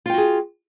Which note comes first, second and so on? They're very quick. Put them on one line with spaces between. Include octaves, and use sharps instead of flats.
F4 G5 F#4 G#4